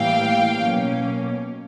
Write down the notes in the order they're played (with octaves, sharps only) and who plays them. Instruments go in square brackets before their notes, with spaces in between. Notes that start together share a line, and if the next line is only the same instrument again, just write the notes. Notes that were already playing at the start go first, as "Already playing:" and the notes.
Already playing: [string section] A2 E3 G3 A#3 F5 G5
B2 F#3 A#3 C#4